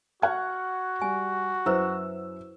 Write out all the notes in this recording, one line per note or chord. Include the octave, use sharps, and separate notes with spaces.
F#4 F#5 F6 G#6
G3 G#5
F#2 E4 B4 C5 E5 E6